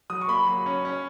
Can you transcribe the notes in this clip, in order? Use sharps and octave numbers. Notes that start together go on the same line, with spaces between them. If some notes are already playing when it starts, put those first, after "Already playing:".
F#3 D#6
C#6
A#3 B5
F#3
C#4
C#4